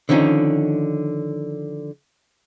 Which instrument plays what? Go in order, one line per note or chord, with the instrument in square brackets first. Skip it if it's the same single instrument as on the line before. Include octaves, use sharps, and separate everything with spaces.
[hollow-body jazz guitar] D3 D#3 F3 C#4 D#4